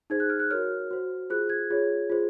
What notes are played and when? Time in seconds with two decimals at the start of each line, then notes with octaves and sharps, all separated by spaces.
0.10 D#4 G#4 C5 G#6
0.20 F#6
0.30 F6
0.40 F#6
0.50 F#4 A#4 C#5 F6
0.91 F#4 C5
1.30 F4 G#4 C5 F#6
1.50 G#6
1.70 F4 G#4 C#5
2.10 F4 G#4 C5